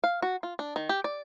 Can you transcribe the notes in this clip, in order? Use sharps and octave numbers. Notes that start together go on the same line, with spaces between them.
F5
F#4
F4
D4
D#3
G4
D5